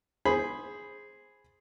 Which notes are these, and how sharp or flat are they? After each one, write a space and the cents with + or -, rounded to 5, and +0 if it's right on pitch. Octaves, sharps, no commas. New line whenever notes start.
G#4 +0 C5 +10 B5 +5